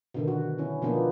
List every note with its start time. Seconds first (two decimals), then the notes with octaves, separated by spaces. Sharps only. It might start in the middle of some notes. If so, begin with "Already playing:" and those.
0.14 B2 D3 D#3
0.28 F#4
0.58 C#4 E4
0.82 B2 F3 A#3 B3 D4 D#4